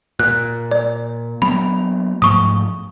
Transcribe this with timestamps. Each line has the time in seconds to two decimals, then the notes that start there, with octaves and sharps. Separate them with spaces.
0.19 A#2 F#6
0.71 D5
1.42 F#3 A#3 B3 B5
2.22 G#2 F3 A3 C#6 D#6